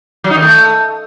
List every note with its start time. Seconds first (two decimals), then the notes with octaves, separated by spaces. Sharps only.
0.24 F#3
0.30 D#4
0.36 D#3
0.42 A3